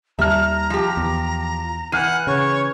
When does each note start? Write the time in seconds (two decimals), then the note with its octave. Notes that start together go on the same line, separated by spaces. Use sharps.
0.19 D#2 G3 E5 A5 A#5 F6
0.70 F3 G4
0.97 E2
1.92 E3 F#5 F6 G6 D#7
2.27 C#3 C#5